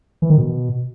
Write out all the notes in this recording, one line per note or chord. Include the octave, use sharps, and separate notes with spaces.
E3
D#3
B2